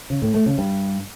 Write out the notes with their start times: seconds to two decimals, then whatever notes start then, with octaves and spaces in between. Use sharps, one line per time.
0.10 C#3
0.22 A2
0.34 A3
0.46 C#3
0.58 G2